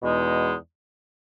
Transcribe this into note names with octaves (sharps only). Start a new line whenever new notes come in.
E2 B2 G#3 D#4